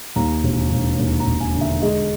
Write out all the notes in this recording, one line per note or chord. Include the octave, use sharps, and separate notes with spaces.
D#2 A#5
E1
E1
D#2
A#5
E1
G#5
D3
E5
G#3 D#5